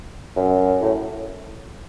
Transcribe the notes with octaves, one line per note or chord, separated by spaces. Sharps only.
F#2
A2